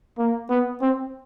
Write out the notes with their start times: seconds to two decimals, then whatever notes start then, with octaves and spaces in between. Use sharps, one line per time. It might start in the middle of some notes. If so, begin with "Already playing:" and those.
0.18 A#3
0.49 B3
0.82 C4